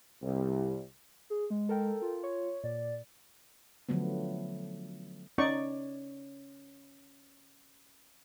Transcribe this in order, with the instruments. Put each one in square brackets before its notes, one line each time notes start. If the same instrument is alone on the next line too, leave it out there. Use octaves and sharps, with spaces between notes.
[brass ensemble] C2
[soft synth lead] G#4
G#3
[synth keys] A4 A#4 G5
[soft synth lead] F4
[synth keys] C#5
[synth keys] A#2 [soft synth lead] D5
[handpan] D3 F3 F#3 A3 B3
[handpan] C#4 C#5 [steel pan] D#4 D5 C#6